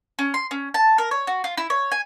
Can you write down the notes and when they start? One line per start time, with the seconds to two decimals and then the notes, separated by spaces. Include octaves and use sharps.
0.19 C#4
0.34 C6
0.51 C#4
0.74 A5
0.98 A#4
1.11 C#5
1.27 F#4
1.44 F4
1.57 E4
1.70 C#5
1.91 G#5